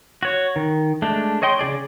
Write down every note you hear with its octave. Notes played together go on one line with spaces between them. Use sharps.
F#4 C#5
D#3
G#3 A3 D4
C#5 D#5 G5 C6
C#3 F3 G#4 D5